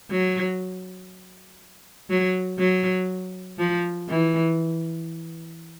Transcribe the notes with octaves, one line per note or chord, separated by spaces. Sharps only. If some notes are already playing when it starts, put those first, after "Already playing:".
F#3
F#3
F#3
F3
E3